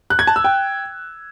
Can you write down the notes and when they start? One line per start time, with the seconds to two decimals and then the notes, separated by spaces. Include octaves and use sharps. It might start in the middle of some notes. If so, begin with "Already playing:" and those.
0.10 F#6
0.19 G#6
0.27 A5
0.36 E6
0.44 G5